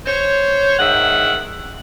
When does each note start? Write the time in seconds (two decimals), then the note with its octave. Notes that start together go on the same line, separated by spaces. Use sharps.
0.06 C5 C#5
0.79 G#2 D#3 E5 F#5